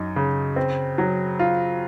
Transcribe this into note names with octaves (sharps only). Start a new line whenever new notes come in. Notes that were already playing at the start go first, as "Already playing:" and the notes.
Already playing: F#2 D#4
C#3
C4
F#3
F4